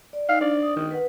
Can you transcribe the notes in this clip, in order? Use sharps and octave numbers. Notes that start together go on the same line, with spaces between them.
D5
D#4 F5
D4 D5
D#6
D#3
B4 F#5